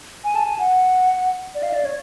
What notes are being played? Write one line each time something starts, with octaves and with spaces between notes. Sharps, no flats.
G#5
A5
G#5
F#5
D5
F5
D5
C#5